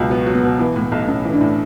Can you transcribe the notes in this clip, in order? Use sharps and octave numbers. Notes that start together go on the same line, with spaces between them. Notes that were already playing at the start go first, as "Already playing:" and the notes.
Already playing: C#2 B2 F#3
B3 F#4
F#3
B3
B2
E3 B3
A2
A3
B1
B1 C#4
E3
D4
A2